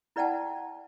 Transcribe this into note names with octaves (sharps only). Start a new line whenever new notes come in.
E4 B4 D5 F#5 G5 A5